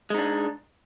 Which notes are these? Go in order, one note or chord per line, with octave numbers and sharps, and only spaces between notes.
G#3 D4 D#4